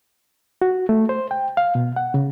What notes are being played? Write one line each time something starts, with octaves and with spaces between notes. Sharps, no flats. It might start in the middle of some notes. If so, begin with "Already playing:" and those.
F#4
A3
C5
G5
F5
B2
F#5
C#3